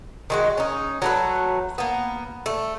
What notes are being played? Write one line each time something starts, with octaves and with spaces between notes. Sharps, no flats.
D#3 G#3 F#4
C#4 D#4
F#3 A3 B4
A#3 B3
A3